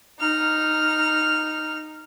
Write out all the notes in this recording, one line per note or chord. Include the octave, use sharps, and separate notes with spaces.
D#4 F6